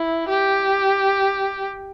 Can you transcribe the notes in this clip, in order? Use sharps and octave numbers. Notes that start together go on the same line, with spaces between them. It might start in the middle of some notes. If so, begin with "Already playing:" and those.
Already playing: E4
G4